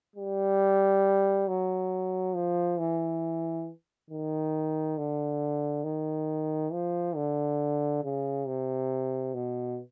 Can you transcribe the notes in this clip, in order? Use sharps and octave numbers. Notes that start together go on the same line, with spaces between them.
G3
F#3
F3
E3
D#3
D3
D#3
F3
D3
C#3
C3
B2